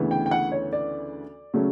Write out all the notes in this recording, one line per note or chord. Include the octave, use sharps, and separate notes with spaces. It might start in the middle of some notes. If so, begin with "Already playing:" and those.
Already playing: D2 C#3 E3 B3
G5
G5
F#5
C#5
D5
C#3 F#3 A3 C#4